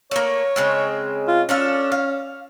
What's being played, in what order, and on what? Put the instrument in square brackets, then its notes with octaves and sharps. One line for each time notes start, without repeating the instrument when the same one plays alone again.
[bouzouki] A3 A#3 [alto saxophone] C#5
[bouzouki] C#3 G#3 C4
[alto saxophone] F4
[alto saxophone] C#4 [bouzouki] D4 F4 A4
[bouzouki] F5